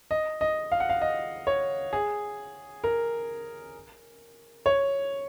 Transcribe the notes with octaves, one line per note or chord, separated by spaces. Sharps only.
D#5
D#5
F5
F#5
F5
D#5
C#5
G#4
A#4
C#5